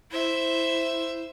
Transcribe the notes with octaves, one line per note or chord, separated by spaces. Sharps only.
E4 C5 E5